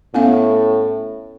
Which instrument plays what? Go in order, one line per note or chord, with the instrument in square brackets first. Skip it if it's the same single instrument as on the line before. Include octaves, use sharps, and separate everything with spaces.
[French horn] A2 [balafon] B3 C#4 F5